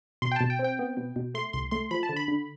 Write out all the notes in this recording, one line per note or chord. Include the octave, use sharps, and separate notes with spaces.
B2 C6
G5
B2 A5
G5
C4
G5
B3
B2
B2
A3 C6
C2 C6
A3 C6
F3 B5
A5
D3
B5
D3